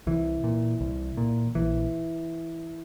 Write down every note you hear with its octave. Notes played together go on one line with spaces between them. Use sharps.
C2 E3
A#2
C2
A#2
A#1 E3